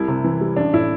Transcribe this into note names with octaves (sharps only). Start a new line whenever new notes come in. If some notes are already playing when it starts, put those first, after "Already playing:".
Already playing: C2 G3 E4
C3
E3
G3
A1 D4
A2 E4